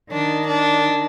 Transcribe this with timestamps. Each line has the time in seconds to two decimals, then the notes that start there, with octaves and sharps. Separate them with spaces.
0.12 D#3 D4
0.47 D4